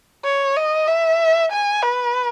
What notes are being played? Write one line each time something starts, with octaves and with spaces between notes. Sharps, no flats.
C#5
D#5
E5
G#5
B4